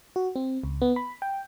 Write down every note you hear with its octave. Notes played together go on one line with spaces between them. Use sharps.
F#4
C4
C#2
B3
B5
G5